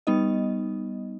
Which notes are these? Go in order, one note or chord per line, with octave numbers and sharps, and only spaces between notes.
G3 B3 D#4 D#5